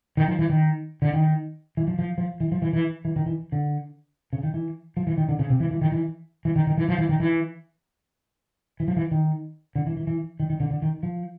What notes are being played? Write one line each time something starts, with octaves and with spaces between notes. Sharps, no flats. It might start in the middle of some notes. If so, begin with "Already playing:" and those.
D#3
F3
E3
D#3
D3
D#3
E3
F3
F3
F3
E3
F3
E3
E3
E3
D#3
E3
D3
C#3
D#3
E3
F3
E3
D#3
D3
C#3
C3
E3
E3
D#3
E3
E3
D#3
D#3
E3
F3
E3
D#3
E3
E3
F3
E3
D#3
D3
E3
E3
E3
D#3
D#3
D3
D3
D#3
F3